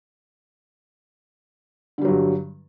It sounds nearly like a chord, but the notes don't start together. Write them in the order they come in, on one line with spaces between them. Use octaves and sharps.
D3 G3 F#3 G2